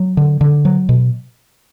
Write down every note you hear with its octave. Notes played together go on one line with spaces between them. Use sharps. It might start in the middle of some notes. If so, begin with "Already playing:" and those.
Already playing: F#3
D3
D3
F#3
B2